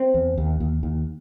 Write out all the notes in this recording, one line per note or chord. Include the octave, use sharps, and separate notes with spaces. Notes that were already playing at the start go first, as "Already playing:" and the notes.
Already playing: C4
E2
D#2
D#2
D#2